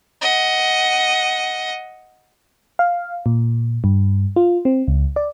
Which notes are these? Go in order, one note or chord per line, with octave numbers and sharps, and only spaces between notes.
D#5 F#5
F5
A#2
G2
F4
C4
C#2
D5